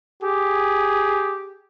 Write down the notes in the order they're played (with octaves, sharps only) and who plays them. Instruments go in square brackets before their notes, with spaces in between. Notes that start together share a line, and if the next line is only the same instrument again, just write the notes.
[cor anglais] G4 [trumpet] G#4